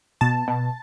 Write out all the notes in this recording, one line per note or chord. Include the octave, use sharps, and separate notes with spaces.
B2 A5
B2